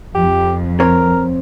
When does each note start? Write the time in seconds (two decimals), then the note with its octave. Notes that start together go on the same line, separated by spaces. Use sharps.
0.15 F2 G4
0.80 C4 A#4 C#5